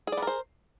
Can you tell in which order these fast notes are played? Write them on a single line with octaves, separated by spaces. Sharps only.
G#4 D5 B3 A#4 C5